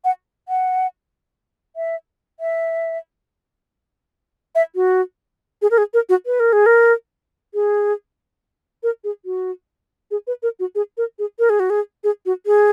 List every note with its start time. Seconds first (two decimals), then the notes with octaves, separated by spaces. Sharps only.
0.05 F#5
0.49 F#5
1.76 E5
2.40 E5
4.55 E5
4.75 F#4
5.62 G#4
5.71 A#4
5.78 G#4
5.94 A#4
6.09 F#4
6.26 B4
6.40 A#4
6.53 G#4
6.66 A#4
7.54 G#4
8.83 A#4
9.04 G#4
9.25 F#4
10.11 G#4
10.27 B4
10.43 A#4
10.60 F#4
10.75 G#4
10.97 A#4
11.19 G#4
11.39 A#4
11.50 G#4
11.60 F#4
11.70 G#4
12.04 G#4
12.26 F#4
12.46 G#4